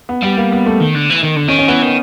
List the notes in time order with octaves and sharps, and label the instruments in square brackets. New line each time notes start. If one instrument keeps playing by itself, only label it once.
[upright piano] B3
[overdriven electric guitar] G3 [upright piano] B3
[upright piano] A#3
B3
A3
[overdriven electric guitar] D#3
D3
E3
D#3
D3
[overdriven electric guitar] D#3 [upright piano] C#4
[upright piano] C#4
[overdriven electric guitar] E3 [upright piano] B3
[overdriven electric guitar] D#3